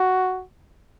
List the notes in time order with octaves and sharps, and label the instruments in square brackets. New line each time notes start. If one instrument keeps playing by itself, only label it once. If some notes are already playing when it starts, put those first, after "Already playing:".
Already playing: [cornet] F#4